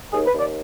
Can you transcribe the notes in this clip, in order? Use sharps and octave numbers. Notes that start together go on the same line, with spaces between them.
D#2 G#4
B4
D#2
D5